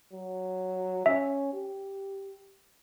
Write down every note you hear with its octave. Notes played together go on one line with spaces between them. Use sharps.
F#3
C#4 E5
G4